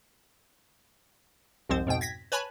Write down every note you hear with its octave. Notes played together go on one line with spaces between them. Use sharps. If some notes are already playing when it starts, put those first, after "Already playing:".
C2 F2 G#2 F3 C4 C5
F2 G#2 B2 G5
G#6 A#6 B6
B4 C#5 G#5 A5 B5